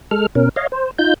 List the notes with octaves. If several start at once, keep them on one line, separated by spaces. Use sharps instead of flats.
G#3 A4 F6
B2 C#4 A#4
C#5 D#5 F5
C5
D#4 F4 G6